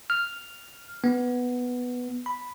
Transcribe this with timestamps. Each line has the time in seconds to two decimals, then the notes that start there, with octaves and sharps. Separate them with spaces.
0.10 F6
1.04 B3
2.26 B5